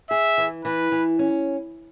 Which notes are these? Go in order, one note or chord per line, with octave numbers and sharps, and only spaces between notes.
G#4 E5
E3
E3 B4
E3
C#4